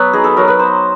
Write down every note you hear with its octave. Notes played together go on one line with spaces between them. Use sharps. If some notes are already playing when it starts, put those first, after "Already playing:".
Already playing: F#3 B3 B4
D#4 G#4
A4
F#3 A#4
B4
B3 C5